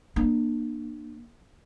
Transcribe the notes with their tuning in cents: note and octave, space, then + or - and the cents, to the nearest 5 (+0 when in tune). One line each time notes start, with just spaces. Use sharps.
A#3 +25 D4 +40